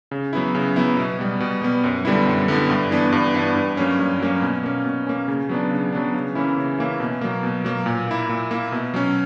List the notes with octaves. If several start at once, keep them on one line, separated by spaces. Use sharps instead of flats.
C#3
F#3 B3 E4
C#3
F#3 B3 E4
B2
G3 B3
B2
G3 B3
F#2
D3 G3 B3 E4
F#2
D3 G3 B3 E4
G2
E3 B3 D4
G2
E3 B3 D4
G2
F#3 A#3 C#4
G2
F#3 A#3 C#4
B2
A#3 C#4
B2
A#3 C#4
C#3
F#3 B3 D4
C#3
F#3 B3 D4
C#3
E3 A#3 C#4 E4
C#3
E3 A#3 C#4 E4
B2
F#3 A#3
B2
F#3 A#3
A#2
A#3 E4
A#2
A#3 E4
B2
F#3 C#4